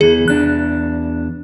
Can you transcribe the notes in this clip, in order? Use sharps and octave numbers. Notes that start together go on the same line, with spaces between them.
E2 E3 G#4
E2 D4 F#6